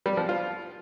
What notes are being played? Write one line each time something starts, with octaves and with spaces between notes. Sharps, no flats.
G3
F3
F4